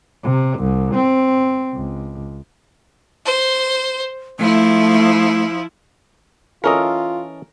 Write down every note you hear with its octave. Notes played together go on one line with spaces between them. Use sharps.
C3
C2
C4
C#2
C5
F3 A3 E4
E3 C#4 F4 A4 A#4 D#5